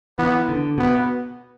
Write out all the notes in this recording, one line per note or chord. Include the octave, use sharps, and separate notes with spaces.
E3 B3
D3
B2 B3